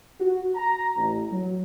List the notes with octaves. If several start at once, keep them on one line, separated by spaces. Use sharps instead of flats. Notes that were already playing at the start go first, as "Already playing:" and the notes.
F#4
A#5
A1
F#3